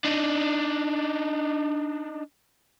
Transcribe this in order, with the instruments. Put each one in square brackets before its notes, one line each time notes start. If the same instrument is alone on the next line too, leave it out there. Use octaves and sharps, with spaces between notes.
[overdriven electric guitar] D4 D#4